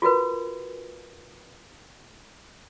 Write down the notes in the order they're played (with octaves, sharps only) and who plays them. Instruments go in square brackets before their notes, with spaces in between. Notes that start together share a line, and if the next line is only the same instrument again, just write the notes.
[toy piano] F4 F#4 A#4 B4